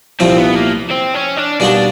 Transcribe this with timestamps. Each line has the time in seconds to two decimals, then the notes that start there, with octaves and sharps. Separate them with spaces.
0.20 C2 A#2 F3 A3 C4
0.38 B3
0.55 A#3
0.90 C4
1.14 C#4
1.36 D4
1.60 B2 G3 A#3 D4 D#4 F#4